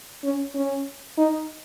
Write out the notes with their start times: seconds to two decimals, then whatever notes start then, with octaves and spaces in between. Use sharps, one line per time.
0.23 C#4
0.55 C#4
1.18 D#4